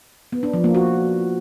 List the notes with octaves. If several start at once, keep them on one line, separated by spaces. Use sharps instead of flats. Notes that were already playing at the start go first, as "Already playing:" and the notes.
B3
D4
F3
A#3
F#4